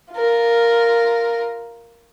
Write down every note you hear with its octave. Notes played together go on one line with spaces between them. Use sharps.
F4 A#4